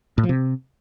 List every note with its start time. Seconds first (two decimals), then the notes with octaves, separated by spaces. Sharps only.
0.18 A2
0.23 F3
0.29 C3